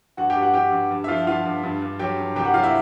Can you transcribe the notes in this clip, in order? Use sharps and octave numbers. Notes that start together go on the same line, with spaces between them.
G2 F#4 F#5
G4 G5
G2
F#4 F#5
G2 G4 G5
G2
G2
E5
F3 F4 F5
F#5
G2 F4 F5
G2
G2
G2
F#3 G4 G5
G2
C2 G4 G5
F#4 F#5
F#3 F4 F5
E4 E5